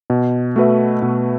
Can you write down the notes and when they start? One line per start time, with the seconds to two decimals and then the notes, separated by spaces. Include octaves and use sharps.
0.10 B2
0.56 A3 F#4 B4 E5
1.02 B2